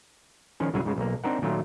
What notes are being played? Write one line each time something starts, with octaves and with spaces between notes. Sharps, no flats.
D#3 F3 C#4
C2 G#2 C#3 F#3 G#4 G#5
G#2 C#3 G#3
B1 A#3
C4 D4 D#4 A#4 F#5
A#2 D#3 F#3 A3 F4